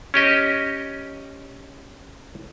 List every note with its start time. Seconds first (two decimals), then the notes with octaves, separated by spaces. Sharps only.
0.14 C#4 G4 D#5